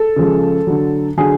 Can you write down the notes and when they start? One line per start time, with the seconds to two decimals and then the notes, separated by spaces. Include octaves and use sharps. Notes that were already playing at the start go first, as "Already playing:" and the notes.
Already playing: A4
0.16 C#3 F3 G#3
0.67 D3 F#3
1.17 D3 F#3 G#4